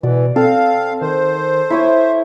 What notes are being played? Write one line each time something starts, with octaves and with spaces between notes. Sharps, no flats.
B2 E3 D5
C4 A4 F5
D#3 C5
E4 C#5 E5 D#6